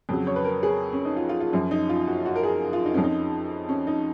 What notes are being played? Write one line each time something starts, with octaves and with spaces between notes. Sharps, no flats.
F2 C#3 F#3
C#5
B4
A#4
G#4
C#4
D#4
F4
F4
F4
F#2 F3 C#4
D#4
F4
F#4
F#4
A#4
G#4
F4
D#4
F2 F3 C#4
D#4
C#4
D#4